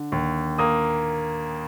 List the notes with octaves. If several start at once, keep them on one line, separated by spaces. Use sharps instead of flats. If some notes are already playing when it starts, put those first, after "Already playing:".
Already playing: D3
D#2
A#3 D#6